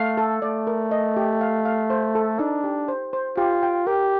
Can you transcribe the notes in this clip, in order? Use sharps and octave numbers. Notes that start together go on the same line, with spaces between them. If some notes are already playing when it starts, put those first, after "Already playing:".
Already playing: A3 F5
A4
A3 D5
A#4
D#5
G4
F5
F5
C5
A4
D4 D#4
G4
C5
C5
F4 G4
G5
G4 A#4